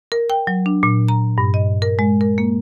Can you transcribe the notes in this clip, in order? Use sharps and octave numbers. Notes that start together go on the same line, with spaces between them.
A#4
G5
F#3
D4
A#2
A#5
G2
D#5
A#4
G#3
A#4
A#3